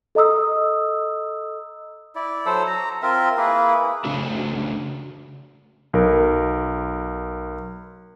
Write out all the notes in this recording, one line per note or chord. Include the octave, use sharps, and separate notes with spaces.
A4 D#5 A#5 D#6 E6
E4 D5
F#3 A4 C5 E6
A#5
C4 F4 A#4 E5
A#3 E4 G#4 B4
C#3 A3 D4 F#4
B1 A#4